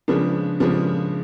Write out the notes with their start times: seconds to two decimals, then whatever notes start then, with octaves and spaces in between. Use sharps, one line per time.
0.08 C#3 F3 G#3 B3 D4
0.60 C#3 F3 G#3 B3 D4